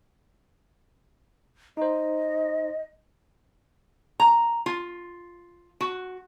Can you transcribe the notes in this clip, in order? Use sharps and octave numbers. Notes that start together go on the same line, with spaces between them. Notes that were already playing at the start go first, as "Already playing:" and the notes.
D#4 C5 D#5
A#5
F4
F#4